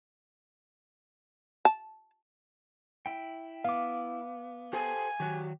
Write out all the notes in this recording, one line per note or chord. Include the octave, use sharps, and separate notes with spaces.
A5
E4 G5
B3 F5 D6
G4 A4 C5 G#5
D#3 F#3 F#4 G4